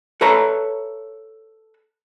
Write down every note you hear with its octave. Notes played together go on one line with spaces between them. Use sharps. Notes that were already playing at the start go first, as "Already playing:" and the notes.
A4 B4 C#5 E5 A#5